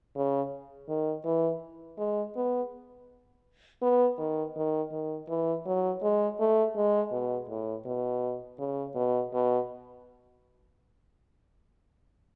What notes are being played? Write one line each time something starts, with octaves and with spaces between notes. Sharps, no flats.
C#3
D#3
E3
G#3
B3
B3
D#3
D#3
D#3
E3
F#3
G#3
A3
G#3
B2
A2
B2
C#3
B2
B2